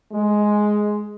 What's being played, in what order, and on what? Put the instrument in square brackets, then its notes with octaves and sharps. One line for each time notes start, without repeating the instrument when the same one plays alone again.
[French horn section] G#3